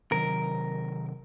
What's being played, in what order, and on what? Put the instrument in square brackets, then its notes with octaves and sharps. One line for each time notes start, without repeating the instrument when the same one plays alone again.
[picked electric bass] C3 D#3 F#3 [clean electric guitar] A#4